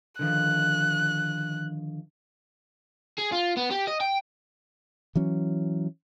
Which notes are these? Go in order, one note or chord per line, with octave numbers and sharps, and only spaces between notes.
D3 D#3 F3 F#6
G#4
F4
B3
G4
D#5
G5
E3 F#3 C#4